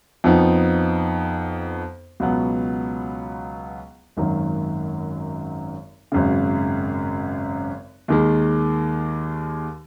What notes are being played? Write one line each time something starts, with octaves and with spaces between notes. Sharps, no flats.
F2 F3 B3 D#4
C#2 B2 F#3 B3
G#1 F#2 D#3 F#3
G#1 F#2 C#3
D#2 D#3 G#3